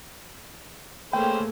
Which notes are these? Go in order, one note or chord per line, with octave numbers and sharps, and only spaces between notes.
A3 A#3 C#4 G#4 B4 C5 G5